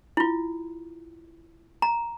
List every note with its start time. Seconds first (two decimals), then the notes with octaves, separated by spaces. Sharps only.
0.17 E4 F4
1.82 A#5